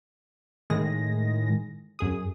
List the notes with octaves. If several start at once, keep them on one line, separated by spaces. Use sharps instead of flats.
A2 D#3 G#3 G#4 A#6
F#2 G#4 D#6